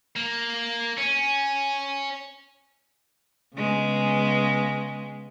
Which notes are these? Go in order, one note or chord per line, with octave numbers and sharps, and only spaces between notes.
A#3
C#4
C#3 G#3 B3